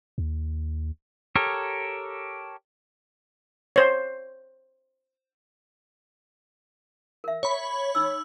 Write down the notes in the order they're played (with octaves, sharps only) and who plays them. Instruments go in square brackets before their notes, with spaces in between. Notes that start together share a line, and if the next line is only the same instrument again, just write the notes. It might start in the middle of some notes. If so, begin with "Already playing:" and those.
[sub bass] D#2
[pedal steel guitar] G4 A4 A#4 C#5
[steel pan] C5 C#5
[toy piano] A#4 E5
[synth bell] C#5 B5
[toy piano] D#4 E6